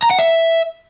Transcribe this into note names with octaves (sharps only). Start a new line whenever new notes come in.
A#5
F#5
E5